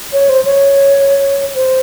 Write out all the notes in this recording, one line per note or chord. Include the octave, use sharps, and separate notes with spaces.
C#5
C5
C#5
C5